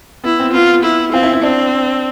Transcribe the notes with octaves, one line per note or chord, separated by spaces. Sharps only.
B3 E4
C4
B3 F4
E4
C4 F4
E4
E4
C4 D4